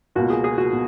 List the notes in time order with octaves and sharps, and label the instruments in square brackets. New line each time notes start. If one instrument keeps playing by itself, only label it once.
[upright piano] C#2 B2 A#3 F4 [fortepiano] F#4
[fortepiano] G#4
G#4
F#4
[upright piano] B2